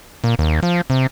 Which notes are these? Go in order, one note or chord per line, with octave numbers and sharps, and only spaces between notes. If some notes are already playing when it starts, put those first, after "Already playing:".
A#2
D#2
F3
C3